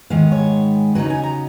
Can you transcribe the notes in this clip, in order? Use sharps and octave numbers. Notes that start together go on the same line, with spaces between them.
G#2 D#3 G#3 B3 F5
C#5
C#3 F#3 B3 D#4 B4
G#5
A#5